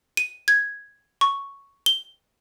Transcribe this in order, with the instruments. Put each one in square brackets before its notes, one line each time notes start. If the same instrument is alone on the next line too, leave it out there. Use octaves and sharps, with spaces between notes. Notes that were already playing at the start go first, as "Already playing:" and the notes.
[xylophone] D#7
G#6
C#6
G7